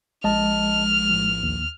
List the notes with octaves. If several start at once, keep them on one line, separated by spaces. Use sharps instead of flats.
A#1 G#3 D#5 A5 F6
A2 F3
D#2